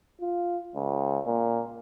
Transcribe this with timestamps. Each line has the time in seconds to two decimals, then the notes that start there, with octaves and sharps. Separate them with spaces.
0.21 F4
0.75 C#2
1.27 A#2